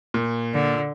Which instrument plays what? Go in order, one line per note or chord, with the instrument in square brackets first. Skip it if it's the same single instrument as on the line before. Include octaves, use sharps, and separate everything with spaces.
[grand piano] A#2
[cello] D3